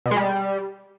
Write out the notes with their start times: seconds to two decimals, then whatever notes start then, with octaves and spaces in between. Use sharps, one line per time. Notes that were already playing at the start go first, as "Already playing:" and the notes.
0.06 B2
0.11 G#3
0.17 G3